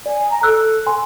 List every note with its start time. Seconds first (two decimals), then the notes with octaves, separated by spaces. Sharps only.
0.06 D5 G#5
0.30 A#5
0.43 A4 E6 F#6
0.87 G#5 C6